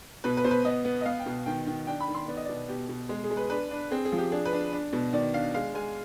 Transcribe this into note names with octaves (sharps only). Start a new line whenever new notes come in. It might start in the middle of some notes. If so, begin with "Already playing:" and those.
B2 B4
B4
B2 C5
B4
B3 D#5
B3
D#5
B3 F5
G5
B2
D#3 G5
D#3
D4 G5
B5
D#3
C6
B3 D5
D#5
B2 D5
B2 G4
B2
G#3 G#4
G#4
G#3
B4
D4 B4
D4
C4 G#4
G#4
F3
G4
D4 G#4
B4
D4
D4
B2
D#3 D5
D4 F5
G#3 F5
G#3 G#5